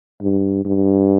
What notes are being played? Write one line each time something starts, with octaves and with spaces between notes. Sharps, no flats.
G2
G2